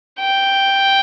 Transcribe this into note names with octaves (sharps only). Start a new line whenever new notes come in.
G5